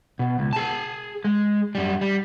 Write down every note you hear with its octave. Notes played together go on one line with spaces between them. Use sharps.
B2
C#2
G#4 A5
G#3
F#2 G3
G3